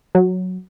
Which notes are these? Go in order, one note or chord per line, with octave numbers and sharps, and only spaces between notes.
F#3